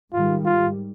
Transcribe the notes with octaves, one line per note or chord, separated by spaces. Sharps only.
G#2 D#3 G3 F4
F4